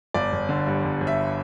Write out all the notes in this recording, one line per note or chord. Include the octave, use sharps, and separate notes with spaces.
G1 D5
G1
D3
G2
G1
G1
E5